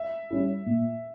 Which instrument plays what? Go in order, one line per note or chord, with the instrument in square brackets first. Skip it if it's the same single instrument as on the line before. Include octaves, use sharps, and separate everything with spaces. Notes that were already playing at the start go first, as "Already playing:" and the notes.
Already playing: [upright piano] E5
[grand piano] G3 C#4 E4
A#2